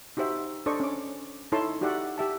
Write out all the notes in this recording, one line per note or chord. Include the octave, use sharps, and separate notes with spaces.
D#4 F#4 G4 C5 E5
D4 A4 C5 D5 D#5 C#6
C#4 D6
D#4 E4 A4 C#5 A5 C6
D#4 F#4 G4 D5 E5 F#5
G4 E5 A5